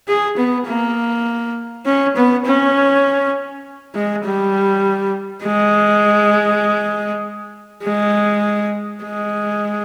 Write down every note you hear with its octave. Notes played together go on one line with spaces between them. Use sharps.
G#4
B3
A#3
C#4
B3
C#4
G#3
G3
G#3
G#3
G#3